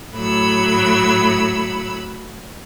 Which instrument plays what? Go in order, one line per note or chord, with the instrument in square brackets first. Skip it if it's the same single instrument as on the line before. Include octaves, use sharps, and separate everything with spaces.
[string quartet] A2 F#3 B5 E6